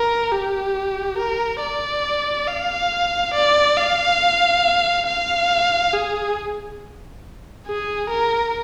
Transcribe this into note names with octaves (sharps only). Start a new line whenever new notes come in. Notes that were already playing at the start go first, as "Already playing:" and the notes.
Already playing: A#4
G4
A#4
D5
F5
D5
F5
F5
G#4
G#4
A#4